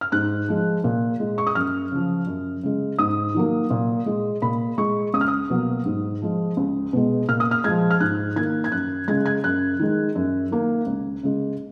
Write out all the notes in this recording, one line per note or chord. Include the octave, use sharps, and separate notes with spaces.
F6
G#2 F#6
F3 G#3
A#2
G#3
C#6
D#6
F#2 F6
C#3 F3
F#2
C#3 G#3
G#2 D#6
D#3 F#3 A#3
A#2
G#3
A#2 B5
G#3 C#6
C#2 D#6
F6
D#6
B2 F#3 A#3
G#2
F3 G#3
C#2
B2 G#3
A#2 F6
D#6
F6
F3 G#3 G#6
F6
G#2 F#6
D#3 A#3 G#6
G#6
F#2 F#6
C#3 G#3 G#6
G#6
F#2 F#6
D#3 G#3
F#2
D#3 A#3
C#2
C#3 G#3